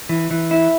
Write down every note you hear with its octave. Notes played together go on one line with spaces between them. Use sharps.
E3
E3
E4